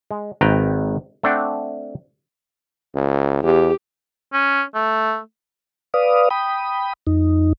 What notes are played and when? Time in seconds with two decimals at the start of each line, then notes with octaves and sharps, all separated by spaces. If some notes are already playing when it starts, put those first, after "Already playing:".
0.11 G#3
0.41 G#1 D#3 B4 G5 A#5
1.23 A3 C4 D4 F#5 G5
2.95 C#2
3.43 E2 G4
4.33 C#4
4.74 A3
5.94 B4 D5 F5 D#6
6.30 G5 B5 D#6
7.07 F2 D#4